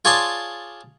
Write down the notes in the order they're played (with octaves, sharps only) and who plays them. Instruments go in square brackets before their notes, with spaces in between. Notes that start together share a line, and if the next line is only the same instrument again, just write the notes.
[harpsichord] F4 G#4 C#5 D5 A5 C6